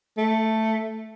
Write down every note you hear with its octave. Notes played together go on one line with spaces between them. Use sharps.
A3